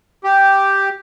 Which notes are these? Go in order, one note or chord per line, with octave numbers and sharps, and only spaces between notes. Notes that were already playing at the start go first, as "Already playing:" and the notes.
G4